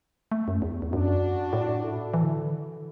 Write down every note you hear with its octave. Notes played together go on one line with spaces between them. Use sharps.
A3
F#2
E2
E2
F#2 D4 F#4
A2
E4 A4
E3
D3